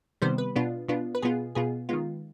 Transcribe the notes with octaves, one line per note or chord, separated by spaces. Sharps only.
C3 D#3 G3 B3 C5
B4
B2 B3 D4 F4
B2 B3 D4 F4
B4
B2 B3 F4 G#4
B2 B3 F4 G#4
D#3 G#3 B3 F4